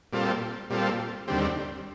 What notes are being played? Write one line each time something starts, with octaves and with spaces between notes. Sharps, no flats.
A#2 G3 C4 F4 A4
A#2 G3 C4 F4 A4
D#2 D3 G3 C4